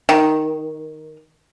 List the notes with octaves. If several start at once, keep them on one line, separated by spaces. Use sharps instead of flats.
D#3